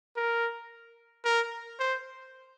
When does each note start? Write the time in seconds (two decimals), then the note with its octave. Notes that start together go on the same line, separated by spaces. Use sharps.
0.16 A#4
1.25 A#4
1.80 C5